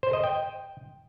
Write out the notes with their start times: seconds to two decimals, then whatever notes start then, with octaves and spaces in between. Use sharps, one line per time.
0.03 C5
0.13 D#5
0.24 G5